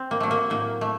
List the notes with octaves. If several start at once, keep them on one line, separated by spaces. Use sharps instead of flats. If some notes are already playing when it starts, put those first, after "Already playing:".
Already playing: C4
A#3
F#3 A3
A#3
A2 A#3
A3